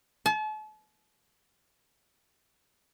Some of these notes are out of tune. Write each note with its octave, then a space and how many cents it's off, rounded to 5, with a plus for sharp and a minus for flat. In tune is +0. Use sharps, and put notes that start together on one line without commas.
A5 -40